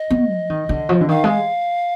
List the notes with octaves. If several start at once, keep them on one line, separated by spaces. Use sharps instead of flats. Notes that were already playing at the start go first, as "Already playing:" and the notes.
Already playing: D#5
B3
F3
D#3
D3
F3
D3
D#3 F5
G#3